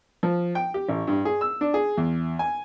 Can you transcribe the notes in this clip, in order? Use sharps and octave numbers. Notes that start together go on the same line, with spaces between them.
F3
G5
G4
A1
G2
G#4
E6
D4
G#4
E2
G#5